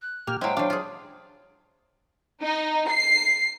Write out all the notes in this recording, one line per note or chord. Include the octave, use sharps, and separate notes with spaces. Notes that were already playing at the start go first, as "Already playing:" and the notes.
F#6
A#2 A#3 G4 F6
F#3 G#3 E4 C5 G5
F#3 D4 F5
F4 G#4
D#4
C7